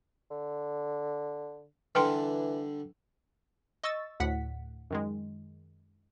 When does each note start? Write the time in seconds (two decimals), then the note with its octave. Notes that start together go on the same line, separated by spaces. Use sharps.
0.31 D3
1.95 D3 E3 G3 D4 B4 G5 C6
3.84 D#5 C#6 E6 A6
4.20 D2 A2 F#5 B6
4.90 F#2 D#3 G#3